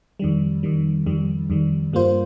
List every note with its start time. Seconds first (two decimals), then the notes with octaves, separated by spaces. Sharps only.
0.19 F2 D#3 G3
0.63 F2 D#3 G3
1.06 F2 D#3 G3
1.50 F2 D#3 G3
1.93 G2 G3 A#3 F4 C5